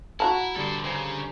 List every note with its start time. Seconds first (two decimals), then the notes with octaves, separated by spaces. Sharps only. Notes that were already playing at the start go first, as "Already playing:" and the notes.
0.20 E4 F#4 F#5 A5 A#5
0.56 G2 D3 A4 C5
0.84 C#3 C5 G#5 A#5